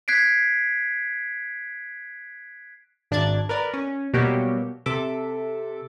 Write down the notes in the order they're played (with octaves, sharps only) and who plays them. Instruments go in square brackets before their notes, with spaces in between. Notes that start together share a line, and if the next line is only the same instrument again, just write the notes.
[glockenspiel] F#6 G#6 B6 C7 D7
[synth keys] G#1 D4 D5 F#6 G#6 A6
A#4 B4 D5
C#4
B2 F#3 G3 A#3 F#4 G4
C3 A4 E5 D6